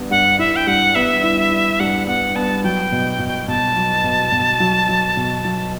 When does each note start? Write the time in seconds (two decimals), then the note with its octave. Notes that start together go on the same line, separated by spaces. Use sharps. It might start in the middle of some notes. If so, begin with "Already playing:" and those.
Already playing: G2 B3
0.11 G2 F#5
0.39 E4 E5
0.56 G5
0.67 G2 F#5
0.95 B3 E5
1.23 E4
1.51 E4
1.80 G2 F#5
2.07 B3 F#5
2.36 B3 A5
2.64 F#3 G5
2.92 B2
3.19 B2
3.48 B2 A5
3.76 F#3
4.04 B2
4.32 B2
4.60 F#3
4.89 F#3
5.17 B2
5.45 F#3